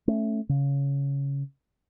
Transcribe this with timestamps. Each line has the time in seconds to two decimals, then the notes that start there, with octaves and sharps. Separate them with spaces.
0.08 A3 C#4
0.49 C#3